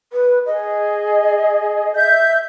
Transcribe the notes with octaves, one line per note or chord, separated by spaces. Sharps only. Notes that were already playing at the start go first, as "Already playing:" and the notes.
B4
G#4 D#5
E5 G6